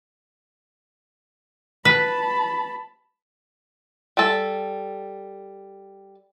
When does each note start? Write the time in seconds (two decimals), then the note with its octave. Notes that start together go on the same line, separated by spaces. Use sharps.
1.85 B4 A5 B5
4.17 G3 A4